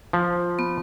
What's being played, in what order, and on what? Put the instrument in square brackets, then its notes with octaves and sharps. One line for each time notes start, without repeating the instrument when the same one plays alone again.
[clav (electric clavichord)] F3
[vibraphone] B3